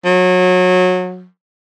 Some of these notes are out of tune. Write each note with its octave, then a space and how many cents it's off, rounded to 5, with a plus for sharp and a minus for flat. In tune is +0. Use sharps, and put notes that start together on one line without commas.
F#3 -25